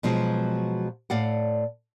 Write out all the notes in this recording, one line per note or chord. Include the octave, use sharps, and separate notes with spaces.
B2 F3 F#3 G#3
A2 D5 F5 F#5